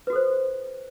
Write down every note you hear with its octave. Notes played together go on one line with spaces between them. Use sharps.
F#4 A4 B4 C5